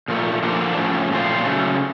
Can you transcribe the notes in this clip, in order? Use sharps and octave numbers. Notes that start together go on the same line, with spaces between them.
A#2 F3 A3
D3 F3 A#3 D4
A2 F3 A3 C#4
A#2 F3 A3 C4 F4
C#3 F#3 A3